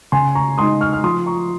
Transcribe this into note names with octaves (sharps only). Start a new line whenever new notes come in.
C#3 G#5 C6
A#5 C#6
G#3 D#4 C6 D#6
C#6 F6
F6
F3 C6 D#6
A#5 C#6